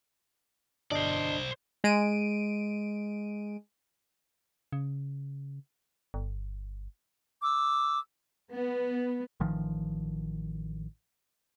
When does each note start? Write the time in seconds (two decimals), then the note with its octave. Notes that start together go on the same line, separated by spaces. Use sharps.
0.91 G1 D4 C5 D5 D#5
1.84 G#3 D7 D#7
4.72 C#3
6.14 G1
7.43 D6 E6
8.52 B3
9.40 A1 D#3 F3